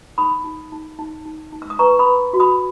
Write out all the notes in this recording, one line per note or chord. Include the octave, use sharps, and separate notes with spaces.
D#4 B5 D#6
D#4
D#4
D#4
D#4
D#4
E6
D#6
B4 A#5 C#6
B5 D#6
B4
F#4
B5 D#6